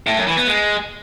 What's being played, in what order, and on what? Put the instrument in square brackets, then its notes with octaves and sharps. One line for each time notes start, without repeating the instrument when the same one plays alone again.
[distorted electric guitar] A2
F#2
E3
B3
G#3